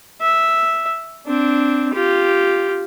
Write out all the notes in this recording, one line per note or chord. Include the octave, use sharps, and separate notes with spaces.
E5
C4 D4
F4 G4